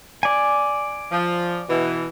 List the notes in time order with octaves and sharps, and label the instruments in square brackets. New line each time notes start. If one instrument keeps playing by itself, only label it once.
[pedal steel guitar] D5 G#5
[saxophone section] F3
B2 E3